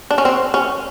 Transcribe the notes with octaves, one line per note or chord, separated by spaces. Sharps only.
D4
C#4
C4
C#4